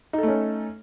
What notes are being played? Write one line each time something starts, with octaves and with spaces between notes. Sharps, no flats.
A3 C#4 D#4 A4